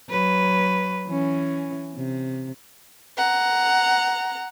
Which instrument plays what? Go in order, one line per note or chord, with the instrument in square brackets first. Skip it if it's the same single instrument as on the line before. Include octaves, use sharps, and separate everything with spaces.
[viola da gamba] F#3 B4
E3 C#4
C3
[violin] F#5 A#5